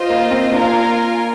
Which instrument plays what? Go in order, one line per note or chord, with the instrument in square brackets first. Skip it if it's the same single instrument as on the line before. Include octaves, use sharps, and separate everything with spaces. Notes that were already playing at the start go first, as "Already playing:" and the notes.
Already playing: [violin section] F4 C5 D#5
[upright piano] A#3
C4
[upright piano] A#3 D4 [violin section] F4 A#4 F5 G#5